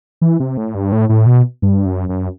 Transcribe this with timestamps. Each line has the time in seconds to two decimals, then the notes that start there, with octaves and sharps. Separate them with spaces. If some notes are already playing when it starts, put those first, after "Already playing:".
0.21 E3
0.40 C3
0.57 A2
0.75 G2
0.92 A2
1.09 A2
1.26 B2
1.62 G2
1.86 F#2
2.09 F#2